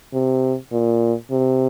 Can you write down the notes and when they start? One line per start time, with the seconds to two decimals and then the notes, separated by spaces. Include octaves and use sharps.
0.14 C3
0.72 A#2
1.31 C3